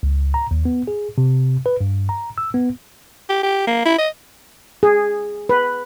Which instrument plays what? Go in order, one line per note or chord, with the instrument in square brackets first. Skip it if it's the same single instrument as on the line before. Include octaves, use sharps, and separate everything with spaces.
[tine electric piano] C#2
A#5
D#2
B3
G#4
C3
B4
G2
A#5
E6
B3
[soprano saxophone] G4
G4
A#3
E4
D#5
[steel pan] G#4
B4